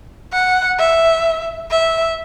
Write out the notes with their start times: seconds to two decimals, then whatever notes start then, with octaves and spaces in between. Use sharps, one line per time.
0.33 F#5
0.79 E5
1.71 E5